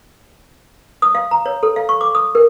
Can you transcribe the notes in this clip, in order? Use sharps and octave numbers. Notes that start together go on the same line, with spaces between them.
D#6
F5
A#5
C#5
A4
F5
C#6
D6
D#6
A#4